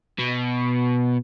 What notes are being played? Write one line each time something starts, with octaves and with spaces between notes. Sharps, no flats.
B2